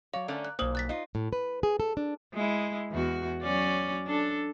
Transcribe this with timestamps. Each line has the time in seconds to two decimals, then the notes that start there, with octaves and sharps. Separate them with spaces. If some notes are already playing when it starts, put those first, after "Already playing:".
0.13 F#3 C#5 D5 F5
0.28 D3 A3 C#4 A#4 D5
0.45 F#6
0.59 B1 A#2 A#3 C5 D#6 F#7
0.75 F#6 A6 B6
0.89 D#4 F4
1.15 A2
1.33 B4
1.63 G#4
1.80 A4
1.97 D4
2.34 G#3 E4
2.92 E2 F#4
3.42 F#3 C#4 D5
4.06 D4 A4